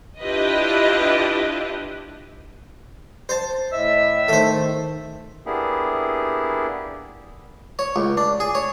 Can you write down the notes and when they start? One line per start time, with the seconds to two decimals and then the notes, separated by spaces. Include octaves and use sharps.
0.20 D4 E4 F4 G4 B4 D#5
3.29 C5 A5
3.72 A2 D#5 E5 E6
4.28 D#3 A3 C5
5.46 A#3 B3 D4 E4 G4 G#4
7.79 C#5
7.96 C#2
8.17 D4
8.40 G#4
8.55 C#5